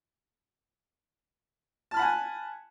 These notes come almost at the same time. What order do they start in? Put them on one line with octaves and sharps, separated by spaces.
A5 F6 B5 F#5 G#5